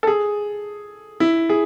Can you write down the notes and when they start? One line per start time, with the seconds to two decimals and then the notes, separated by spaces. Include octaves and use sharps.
0.03 A4
0.07 G#4
1.20 E4
1.49 G#4